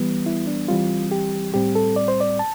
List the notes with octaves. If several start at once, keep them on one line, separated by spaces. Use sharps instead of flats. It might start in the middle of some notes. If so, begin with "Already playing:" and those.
Already playing: E3 G3 B3
E4
D4
E3 G3 C4 F4
G4
A2 G3 C4 G4
A4
D5
C5
D5
A5